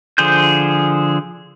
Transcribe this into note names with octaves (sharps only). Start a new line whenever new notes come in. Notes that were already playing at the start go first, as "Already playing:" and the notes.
D3 F3 G#4 C5 G6